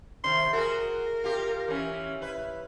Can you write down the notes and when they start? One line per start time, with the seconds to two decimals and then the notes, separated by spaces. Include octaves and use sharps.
0.24 C3 D#3 C6
0.53 F#4 G#4 A#4
1.24 F4 G4
1.68 E3 C#4
2.21 E4 B4